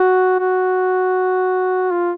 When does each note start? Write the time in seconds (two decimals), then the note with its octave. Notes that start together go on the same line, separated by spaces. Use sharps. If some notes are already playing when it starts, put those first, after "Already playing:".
Already playing: F#4
0.39 F#4
1.91 F4